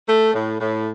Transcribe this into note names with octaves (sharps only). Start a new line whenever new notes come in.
A3
A2
A2